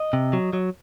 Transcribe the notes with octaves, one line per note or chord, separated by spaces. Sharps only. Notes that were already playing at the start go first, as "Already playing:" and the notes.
Already playing: D#5
C3
F#3
F#3